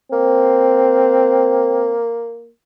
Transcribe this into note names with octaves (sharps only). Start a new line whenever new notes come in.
A#3 C4